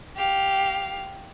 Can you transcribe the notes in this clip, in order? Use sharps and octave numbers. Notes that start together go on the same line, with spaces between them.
G4 F5